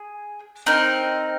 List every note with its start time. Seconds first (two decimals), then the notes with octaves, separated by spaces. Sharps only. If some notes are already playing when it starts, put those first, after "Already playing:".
Already playing: G#4 G#5
0.66 C4 D#4 A#4